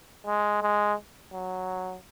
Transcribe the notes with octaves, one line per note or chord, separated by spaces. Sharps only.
G#3
G#3
F#3